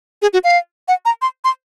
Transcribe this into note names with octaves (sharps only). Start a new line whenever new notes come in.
G#4
F#4
F5
F#5
A#5
C6
C6